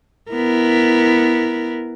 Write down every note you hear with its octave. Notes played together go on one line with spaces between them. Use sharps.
B3 E4 A#4